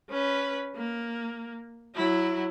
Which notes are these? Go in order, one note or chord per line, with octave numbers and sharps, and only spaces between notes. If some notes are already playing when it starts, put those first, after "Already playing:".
C#4 B4
A#3
F#3 E4